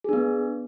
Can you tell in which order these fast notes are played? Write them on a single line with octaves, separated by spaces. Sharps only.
G#4 D4 B3